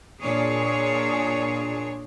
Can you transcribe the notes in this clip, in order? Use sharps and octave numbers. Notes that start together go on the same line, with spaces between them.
A#2 D4 G#4 C#5